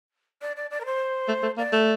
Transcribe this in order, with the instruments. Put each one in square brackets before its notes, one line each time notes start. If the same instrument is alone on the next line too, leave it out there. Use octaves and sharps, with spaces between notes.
[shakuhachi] D5
D5
D5
A#4
C5
[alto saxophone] A3
A3
[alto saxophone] A#3 [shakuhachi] D5
[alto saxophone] A3